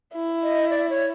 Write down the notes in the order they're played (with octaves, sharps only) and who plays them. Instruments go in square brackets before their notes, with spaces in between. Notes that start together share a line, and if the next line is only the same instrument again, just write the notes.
[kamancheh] E4
[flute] D#5
D5
C#5